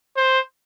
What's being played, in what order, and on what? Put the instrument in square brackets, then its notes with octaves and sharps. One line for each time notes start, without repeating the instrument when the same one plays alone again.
[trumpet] C5